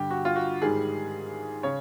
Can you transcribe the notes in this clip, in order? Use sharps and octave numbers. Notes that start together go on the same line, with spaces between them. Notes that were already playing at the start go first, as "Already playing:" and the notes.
Already playing: G2 D3 G3 G4
F#4
F4
F#4
G#2 D#3 G3 G#4
C#3 C#5